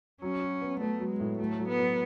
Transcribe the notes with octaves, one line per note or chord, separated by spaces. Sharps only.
F#3 C#4
F#4
B3
A3 B3
F#3
G#3
A2
F#3 A3
F#3
B3
F#3